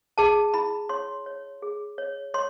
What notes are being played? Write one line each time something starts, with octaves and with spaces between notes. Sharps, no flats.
G#4 A5
E4 B5
C#5 C6
C#5
G#4
C#5
C#5 C6